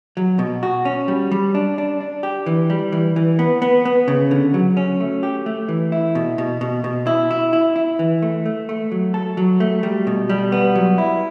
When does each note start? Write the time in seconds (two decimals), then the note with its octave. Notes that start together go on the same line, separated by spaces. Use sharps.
0.17 F#3
0.39 B2
0.63 F#4
0.85 C#4
1.08 G3
1.31 G3
1.55 D4
1.78 D4
2.01 D4
2.23 G4
2.46 E3
2.70 G3
2.92 E3
3.16 E3
3.39 B3
3.62 B3
3.85 B3
4.08 C#3
4.31 D3
4.54 F#3
4.77 C#4
5.00 A3
5.23 G4
5.46 A3
5.69 E3
5.92 E4
6.15 B2
6.38 B2
6.61 B2
6.84 B2
7.07 E4
7.31 E4
7.53 E4
7.76 E4
7.99 E3
8.22 A3
8.46 A3
8.69 A3
8.92 F#3
9.14 A4
9.37 F#3
9.60 A3
9.83 G3
10.07 B2
10.29 G3
10.52 B3
10.75 F#3
10.98 E4